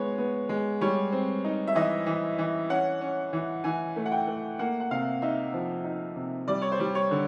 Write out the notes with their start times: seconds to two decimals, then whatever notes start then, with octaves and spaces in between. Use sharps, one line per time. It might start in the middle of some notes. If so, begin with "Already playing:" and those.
Already playing: G#3 B3 C#5
0.18 B3
0.49 G#3
0.81 G3 C#5
1.12 C4
1.44 D#4
1.67 E5
1.75 E3 D#5
2.06 E3
2.39 E3
2.70 C#4 F#5
3.01 C#4
3.33 E3
3.64 E3 G#5
3.96 A3
4.06 F#5
4.12 G5
4.27 A3
4.59 A#3 F#5
4.80 F#5
4.91 C3 F5
5.22 D#4 E5
5.54 F3
5.84 D#4
6.16 C3
6.48 G3 D5
6.62 C#5
6.72 C5
6.80 G3
6.95 C#5
7.11 D3